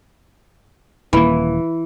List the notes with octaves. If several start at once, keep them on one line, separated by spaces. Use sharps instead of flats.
D#1 E3 A#3